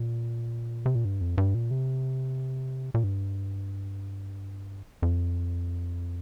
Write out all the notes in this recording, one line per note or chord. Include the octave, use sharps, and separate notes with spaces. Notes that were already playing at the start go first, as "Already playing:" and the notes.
Already playing: A#2
C3
A#2
G2
F2
G2
A#2
C3
A#2
G2
F2